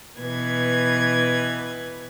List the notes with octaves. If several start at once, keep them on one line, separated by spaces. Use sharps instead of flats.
B2 E3 B4 G#6